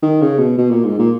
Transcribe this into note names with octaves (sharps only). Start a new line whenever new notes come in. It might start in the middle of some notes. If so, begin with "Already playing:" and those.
D#3
C#3
B2
B2
A#2
G#2
A#2